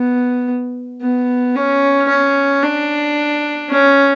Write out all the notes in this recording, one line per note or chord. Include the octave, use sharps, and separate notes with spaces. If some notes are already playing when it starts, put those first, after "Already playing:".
Already playing: B3
B3
C#4
C#4
D4
C#4